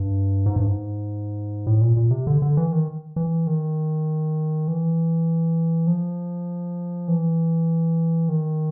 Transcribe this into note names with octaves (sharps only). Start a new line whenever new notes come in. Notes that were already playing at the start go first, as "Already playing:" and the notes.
Already playing: G2
G#2
G2
G#2
A2
A#2
A#2
C3
D3
D3
E3
D#3
E3
D#3
E3
F3
E3
D#3